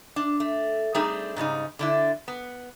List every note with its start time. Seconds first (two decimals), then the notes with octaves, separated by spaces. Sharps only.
0.16 D4
0.40 A3
0.95 G3 A3 C4 D4 D#4 G#4
1.36 G#2 C#3 G3 D#4
1.79 D3 D4 E4
2.28 B3